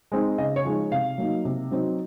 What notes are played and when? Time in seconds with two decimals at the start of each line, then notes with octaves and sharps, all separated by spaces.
0.12 G#3 C4 D#4
0.38 C#3 D#5
0.56 C#5
0.65 F3 G#3 D#4
0.91 C3 F5
1.18 F#3 A#3 D#4
1.45 C3
1.71 F#3 C4 D#4